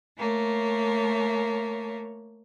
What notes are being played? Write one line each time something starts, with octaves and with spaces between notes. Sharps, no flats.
A3 A#3 C#5